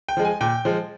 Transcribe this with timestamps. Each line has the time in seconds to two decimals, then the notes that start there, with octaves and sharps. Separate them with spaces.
0.09 G5
0.17 F3 G#3
0.25 G#5
0.41 A#2 G5
0.65 F3 G#3